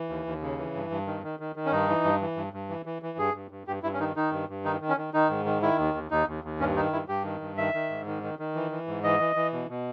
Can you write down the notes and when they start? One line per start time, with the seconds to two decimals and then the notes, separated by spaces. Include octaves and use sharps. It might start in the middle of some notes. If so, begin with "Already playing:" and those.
Already playing: E3
0.09 D#2
0.26 D#2
0.42 C#3
0.58 E3
0.75 G2
0.90 G2
1.07 D#3
1.23 D#3
1.40 D#3
1.56 D#3
1.66 C#4
1.71 G2 D#4
1.88 E3
2.04 G2
2.21 E3
2.37 G2
2.53 G2
2.69 E3
2.86 E3
3.02 E3
3.18 G2 G#4
3.34 G2
3.51 G2
3.67 G2 G4
3.83 G2 E4
3.94 C#4
3.99 D#3 D#4
4.16 D#3 D#4
4.32 G2
4.49 G2
4.65 D#3 D#4
4.81 D#3
4.89 C#4
4.97 D#3
5.13 D#3 D#4
5.29 G#2
5.45 D#3
5.62 D#3 E4
5.79 D#2
5.94 D#2
6.11 D#2 D#4
6.27 D#2
6.44 D#2
6.60 G2 C#4
6.76 D#3 D#4
6.92 G2 E4
7.08 G2 G4
7.25 D#3
7.41 G2
7.57 D#3 E5
7.74 D#3
7.90 G#2
8.06 D#3
8.23 D#3
8.39 D#3
8.55 E3
8.71 E3
8.87 G#2
9.04 E3 D#5
9.20 E3
9.36 E3
9.53 B2
9.69 B2